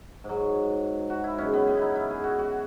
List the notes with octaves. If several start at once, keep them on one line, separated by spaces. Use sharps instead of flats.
G#2 F#3
F#4
E4
F#2 C#3 G#3 C#4
B3
B3
D#4 E4
E4
G#4
F#4
F#4